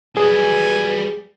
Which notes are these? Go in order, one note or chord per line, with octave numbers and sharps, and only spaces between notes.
F#3 G3 G#4 B4 G#5